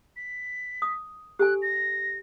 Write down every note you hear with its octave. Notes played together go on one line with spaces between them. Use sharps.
B6
D#6
G4 A4 G#5 F#6
A#6